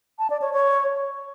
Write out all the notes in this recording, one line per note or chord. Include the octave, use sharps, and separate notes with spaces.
A5
D5
C#5
C#5